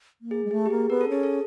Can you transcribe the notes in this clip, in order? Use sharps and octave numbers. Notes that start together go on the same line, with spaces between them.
A#3
G#4
G#3
A3 G#4
G4
A#3 G#4
B3 A#4
A4
C#4 G#4
A4